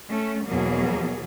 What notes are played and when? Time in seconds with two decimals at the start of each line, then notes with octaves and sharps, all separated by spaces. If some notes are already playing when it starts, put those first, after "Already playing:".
0.10 A3 C#4
0.47 E2 B2 F#3 A#3 G#4